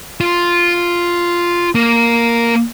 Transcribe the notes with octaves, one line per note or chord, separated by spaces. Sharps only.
F4
A#3